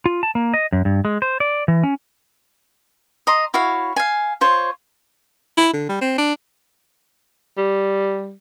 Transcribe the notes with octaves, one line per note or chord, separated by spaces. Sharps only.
F4
A5
A#3
D#5
F#2
G2
G#3
C5
D5
E3
C#4
D#5 A#5 C6
E4 F#4 C#5 F5
F5 G#5
F4 C5 C#5
E4
D3
G3
C4
D4
G3